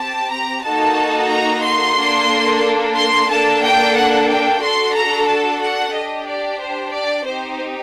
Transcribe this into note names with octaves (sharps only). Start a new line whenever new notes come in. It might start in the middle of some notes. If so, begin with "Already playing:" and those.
Already playing: C4 G4 A5
A#5
A#3 D#4 F#4 A4 A5
A#5
C6
A#3 D4 A4
C6
A#3 D4 A4 A5
G5
F#5
G5
D4 F#4 A4 C6
A#5
A5
F#5
D4 G4 D#5
D5
C5
D5
C4 D#4 G4 C5